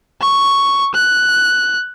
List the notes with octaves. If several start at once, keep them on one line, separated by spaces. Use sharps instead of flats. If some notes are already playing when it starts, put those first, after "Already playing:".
C#6
F#6